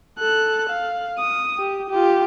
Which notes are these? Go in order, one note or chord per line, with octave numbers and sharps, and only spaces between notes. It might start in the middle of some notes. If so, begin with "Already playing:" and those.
A4 F#6
F5
D#6
G4
F4 G4